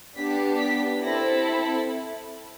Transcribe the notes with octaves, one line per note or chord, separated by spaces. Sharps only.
B3 D4 G4 B6
B6
C4 E4 A4 A#6